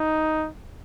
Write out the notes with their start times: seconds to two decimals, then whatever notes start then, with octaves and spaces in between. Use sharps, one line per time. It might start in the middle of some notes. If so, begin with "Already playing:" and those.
Already playing: D#4